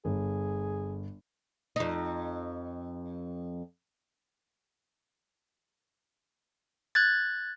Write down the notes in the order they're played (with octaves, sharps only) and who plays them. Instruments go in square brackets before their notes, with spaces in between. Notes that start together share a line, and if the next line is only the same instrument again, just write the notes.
[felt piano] G1 [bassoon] G#4
[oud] F2 D#4
[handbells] F#6 G#6 A6